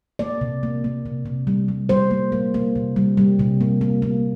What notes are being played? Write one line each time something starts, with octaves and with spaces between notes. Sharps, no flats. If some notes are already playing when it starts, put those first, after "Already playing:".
A#3 D5
C3
A#3
A#3
C3
C3
G3
G3
G3 C5
A#3
A#3
A#3
C3
G3
G3
C3
A#3
A#3
A#3